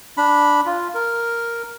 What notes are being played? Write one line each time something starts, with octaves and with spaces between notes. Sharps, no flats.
D4 B5
F4
A#4